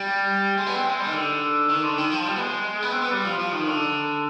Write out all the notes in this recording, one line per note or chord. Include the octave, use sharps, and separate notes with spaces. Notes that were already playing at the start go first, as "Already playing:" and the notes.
Already playing: G3
G#3
B3
C4
G#3
G3
D#3
D3
D#3
D3
D#3
F3
G3
B3
G#3
B3
C4
B3
G3
F3
F3
D#3
D3